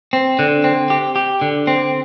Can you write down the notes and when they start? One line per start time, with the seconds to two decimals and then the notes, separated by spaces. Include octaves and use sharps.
0.13 C4
0.39 D3
0.64 C4
0.90 G4
1.16 G4
1.41 D3
1.67 C4